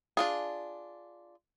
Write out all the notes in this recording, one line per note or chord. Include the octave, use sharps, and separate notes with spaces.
D4 F4 G#4